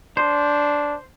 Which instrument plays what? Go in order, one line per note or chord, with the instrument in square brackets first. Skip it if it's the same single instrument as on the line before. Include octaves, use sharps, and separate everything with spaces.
[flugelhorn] D4 [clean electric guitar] C5